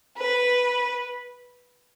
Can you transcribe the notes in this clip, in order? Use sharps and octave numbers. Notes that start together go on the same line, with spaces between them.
B4